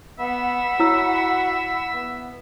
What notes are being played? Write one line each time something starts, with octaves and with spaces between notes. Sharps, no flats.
B3 E5 F#5 B5
E4 F#4 C#5 E6
B3